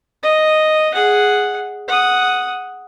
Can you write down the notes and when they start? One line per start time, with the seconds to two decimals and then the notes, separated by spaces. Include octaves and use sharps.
0.23 D#5
0.93 G#4 F#5
1.88 F#5 D#6